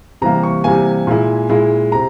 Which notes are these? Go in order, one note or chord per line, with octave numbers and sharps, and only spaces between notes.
C3 E3 G3 A#3 A#5
C#6
C3 E3 G3 A#3 G#5
A#2 G#3 E4
A#2 G#3 E4
C3 A#5